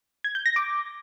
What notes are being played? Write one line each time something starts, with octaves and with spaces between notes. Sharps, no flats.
G#6
G6
A#6
D6